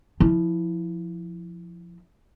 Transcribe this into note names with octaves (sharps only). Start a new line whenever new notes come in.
F3 E4